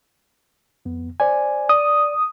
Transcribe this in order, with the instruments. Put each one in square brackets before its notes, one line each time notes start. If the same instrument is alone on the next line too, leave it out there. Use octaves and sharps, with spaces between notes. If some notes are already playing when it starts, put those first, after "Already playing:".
[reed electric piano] F2 B3
C5 D5 G#5
[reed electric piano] D5 [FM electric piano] D#6